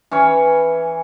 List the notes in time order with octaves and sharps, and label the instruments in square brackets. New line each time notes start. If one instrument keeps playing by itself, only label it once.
[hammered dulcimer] E3 C#4 C#5